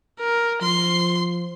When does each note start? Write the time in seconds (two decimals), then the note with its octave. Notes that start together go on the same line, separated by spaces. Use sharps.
0.20 A#4
0.62 F3 C6